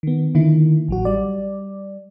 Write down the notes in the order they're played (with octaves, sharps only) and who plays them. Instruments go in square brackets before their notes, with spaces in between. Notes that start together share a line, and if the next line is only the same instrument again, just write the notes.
[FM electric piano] D#3 B3
D3 D#3 A#3 E4
A1 F#3 F#4
G3 D5